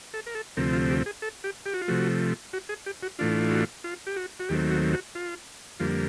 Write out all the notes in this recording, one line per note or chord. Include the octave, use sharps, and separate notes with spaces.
A4
A#4
A4
D2 C3 F3 A3 C4 A#4
F4
G4
G#4
A4
G4
G4
F#4
F4
C3 F3 A3 F#4
F#4
G#4
G4
F#4
A2 E3 A3 D4 F4
F#4
F4
G4
F#4
F#4
D#2 D#3 F#3 A3 C4 G4
F#4
F#4
F4
F2 D3 G3 A#3 F4